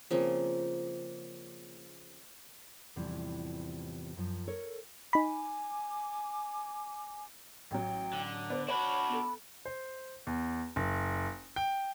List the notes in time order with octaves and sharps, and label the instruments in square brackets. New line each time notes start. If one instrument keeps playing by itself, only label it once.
[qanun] C#3 F3 A#3 C4
[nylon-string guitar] E2 A2 C3 E3 F3 G3
F#2 F3
A4 A#4 C#5
[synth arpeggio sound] D#4 B5 [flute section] G#5 D6
[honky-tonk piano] A1 F#3 [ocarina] G5
[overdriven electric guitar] D3
[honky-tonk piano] B3 B4 D5 [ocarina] C5
[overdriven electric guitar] D4 F#4 [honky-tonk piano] C#5 [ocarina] B5
[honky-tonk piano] B3 A4
[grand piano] C5
E2
F#1
G5